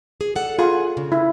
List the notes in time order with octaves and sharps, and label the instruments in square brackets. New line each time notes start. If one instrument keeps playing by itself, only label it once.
[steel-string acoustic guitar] G#4
A4 D5 F#5
[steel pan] F4 [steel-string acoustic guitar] G#4
[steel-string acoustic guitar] C#3
[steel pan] E4